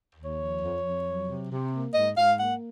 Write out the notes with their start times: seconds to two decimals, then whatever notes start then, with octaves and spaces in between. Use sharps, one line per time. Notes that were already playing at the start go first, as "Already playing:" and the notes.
0.13 D#2
0.25 C#5
0.36 F3
0.59 F2
0.82 F2
1.04 F#3
1.26 C3
1.49 C3
1.72 A#3
1.94 G#2 D#5
2.16 G#2 F5
2.39 A#3 F#5